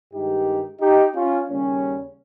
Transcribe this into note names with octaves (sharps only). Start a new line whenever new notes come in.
G2 D#3 G#3 D#4 G4
D#4 G4
C#4 F4
D#2 C#3 G3 A#3 C#4